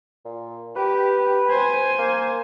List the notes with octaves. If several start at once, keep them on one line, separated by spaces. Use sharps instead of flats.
A#2
G4 B4
C5 G#5
A#3